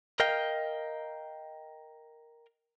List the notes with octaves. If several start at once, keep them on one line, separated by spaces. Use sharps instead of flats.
A#4 D#5 F5 G5